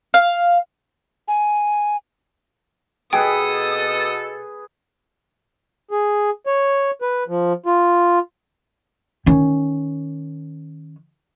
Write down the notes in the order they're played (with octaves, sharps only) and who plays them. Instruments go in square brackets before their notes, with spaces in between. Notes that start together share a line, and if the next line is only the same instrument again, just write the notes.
[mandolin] F5
[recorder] G#5
[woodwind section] B2 A4 [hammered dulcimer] G#4 B4 [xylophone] G5 [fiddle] D#6
[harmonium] G#4
C#5
B4
F3
F4
[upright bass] D#3 C#4